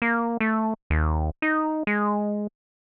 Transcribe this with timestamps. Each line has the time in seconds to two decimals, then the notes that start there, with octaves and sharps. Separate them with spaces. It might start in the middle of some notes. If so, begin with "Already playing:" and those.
0.02 A#3
0.40 A3
0.90 D#2
1.42 D#4
1.87 G#3